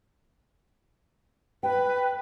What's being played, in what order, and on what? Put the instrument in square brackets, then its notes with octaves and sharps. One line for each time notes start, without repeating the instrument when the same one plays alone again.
[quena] B4 [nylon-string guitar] G5